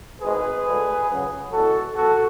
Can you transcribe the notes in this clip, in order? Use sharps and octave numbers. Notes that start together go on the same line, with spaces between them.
G#1 G#2 G#3 G#4 B4
D2 D3 G#3
C#2 C#3 F#3
E2 B2 G#3 F#4 A4
C#2 B2 F#3 F#4 A4